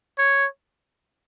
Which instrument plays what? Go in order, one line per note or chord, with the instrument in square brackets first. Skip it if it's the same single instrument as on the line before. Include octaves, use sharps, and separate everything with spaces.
[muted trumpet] C#5